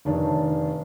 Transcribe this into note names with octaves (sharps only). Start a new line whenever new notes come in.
F1 D#3 D4 C#5